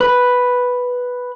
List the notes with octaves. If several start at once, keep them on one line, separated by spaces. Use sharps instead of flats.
B4